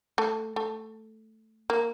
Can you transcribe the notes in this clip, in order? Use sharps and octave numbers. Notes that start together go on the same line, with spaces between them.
A3
A3
A#3